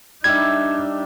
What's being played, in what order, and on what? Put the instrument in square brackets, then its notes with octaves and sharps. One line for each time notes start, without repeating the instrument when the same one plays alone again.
[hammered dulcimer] G3 G4 E5 [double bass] D4 D#4 [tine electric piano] G#6